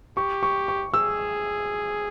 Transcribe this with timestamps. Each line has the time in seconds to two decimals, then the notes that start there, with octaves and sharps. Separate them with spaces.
0.17 G4 C#6
0.43 C#6
0.68 C#6
0.94 G#4 E6